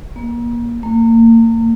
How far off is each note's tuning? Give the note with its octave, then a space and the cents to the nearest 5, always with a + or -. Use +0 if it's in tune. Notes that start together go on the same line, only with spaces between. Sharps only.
A#3 +30
A#3 -35